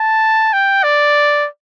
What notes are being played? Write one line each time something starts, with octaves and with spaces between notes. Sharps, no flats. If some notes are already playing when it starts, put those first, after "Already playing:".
Already playing: A5
G5
D5